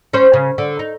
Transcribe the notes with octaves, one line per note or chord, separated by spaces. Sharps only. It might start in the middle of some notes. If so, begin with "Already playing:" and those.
C#4 C5
C#3
D3
D#4